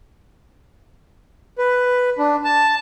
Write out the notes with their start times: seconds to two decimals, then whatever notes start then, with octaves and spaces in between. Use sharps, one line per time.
1.58 B4
2.18 D4
2.45 A5